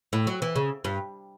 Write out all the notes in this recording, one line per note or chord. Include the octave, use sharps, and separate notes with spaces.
A2
F#3
E3
C#3
G2